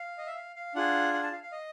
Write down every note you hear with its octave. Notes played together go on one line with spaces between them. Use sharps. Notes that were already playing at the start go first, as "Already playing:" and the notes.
Already playing: F5
D#5
E5
F5
F5
D4 F4 G#4 F#5
F#5
A5
F5
F5
D#5